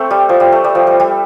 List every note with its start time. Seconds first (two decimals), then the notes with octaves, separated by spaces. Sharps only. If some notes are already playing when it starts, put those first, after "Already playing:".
Already playing: A3 C4
0.11 G3
0.29 F3
0.40 G3
0.52 A3
0.64 G3
0.75 F3
0.87 G3
1.00 G3